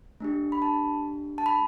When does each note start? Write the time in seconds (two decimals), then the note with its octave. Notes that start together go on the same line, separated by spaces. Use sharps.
0.20 A3 D4 G4
0.52 B5
0.62 A5
1.38 A5
1.46 B5